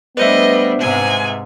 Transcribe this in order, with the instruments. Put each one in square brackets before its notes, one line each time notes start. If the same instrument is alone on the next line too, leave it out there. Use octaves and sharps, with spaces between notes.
[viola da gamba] G3 A3 D4 [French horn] B3 [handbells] B4 C5 E5 [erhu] D#5
[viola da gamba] G#2 C3 G#3 [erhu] G#5